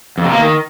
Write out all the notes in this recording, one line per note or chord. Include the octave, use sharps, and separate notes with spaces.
F2
C3
A#3
D#3